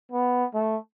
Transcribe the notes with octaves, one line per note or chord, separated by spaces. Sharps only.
B3
A3